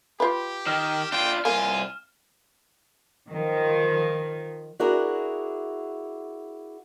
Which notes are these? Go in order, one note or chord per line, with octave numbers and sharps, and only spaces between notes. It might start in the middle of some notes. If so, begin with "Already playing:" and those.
F4 G4 B4
D#3 F6 E7
D4 F4 G5
C2 A#3 F4 G#5
D#3 F3
D4 E4 F#4 G#4 A#4